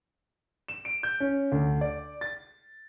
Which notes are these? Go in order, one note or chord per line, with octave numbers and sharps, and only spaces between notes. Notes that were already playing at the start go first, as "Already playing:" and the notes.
E7
D7
G6
C#4
D2
D5
A6